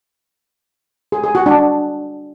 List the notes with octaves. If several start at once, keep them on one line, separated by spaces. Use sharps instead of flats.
G#4
G#4
F#4
D4